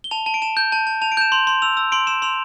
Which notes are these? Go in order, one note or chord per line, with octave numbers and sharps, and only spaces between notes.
G7
A5 F7
A5
D7
A5 E7
G6
A5
A5
A5 F7
D7
G6 E7
C6 F7
C6
E6 F7
E6
C6 D7
C6 E7
C6 F7